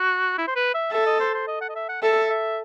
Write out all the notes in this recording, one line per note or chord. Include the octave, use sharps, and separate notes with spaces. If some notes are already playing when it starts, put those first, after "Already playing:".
Already playing: F#4
E4
C5
B4
E5
A4 E5
D#5
C5
C5
D#5
F#5
D#5
E5
F#5
A4 E5
E5